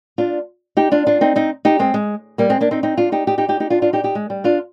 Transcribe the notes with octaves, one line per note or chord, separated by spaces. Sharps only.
D4 F4
D#4 G4
D4 F4
D4 F4
C4 D#4
C4 D#4
D#4 G4
G#3 C4
G#3
G3 A#3
G#3 C4
A#3 D4
C4 D#4
C4 D#4
D4 F4
D#4 G4
D#4 G4
D#4 G4
D#4 G4
D#4 G4
D4 F4
D4 F4
D#4 G4
D#4 G4
G#3
G3
D4 F4